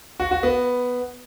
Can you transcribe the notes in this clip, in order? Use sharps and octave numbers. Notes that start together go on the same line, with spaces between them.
F#4
F#4
B3